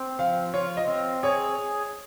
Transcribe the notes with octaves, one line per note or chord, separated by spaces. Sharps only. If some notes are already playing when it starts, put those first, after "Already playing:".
Already playing: C4
F3 F5
F4 C#5
D#5
C4
G#4 C#5